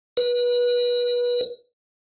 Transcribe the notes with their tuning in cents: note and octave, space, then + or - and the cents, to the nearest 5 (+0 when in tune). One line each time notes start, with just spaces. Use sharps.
B4 -25